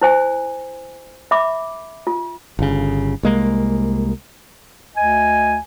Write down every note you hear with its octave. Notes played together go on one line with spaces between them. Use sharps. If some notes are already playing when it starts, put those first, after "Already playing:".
E4 C5 G#5
E5 B5 D6
F4
G1 C#3
C2 G#3 A#3
D2 D#5 G#5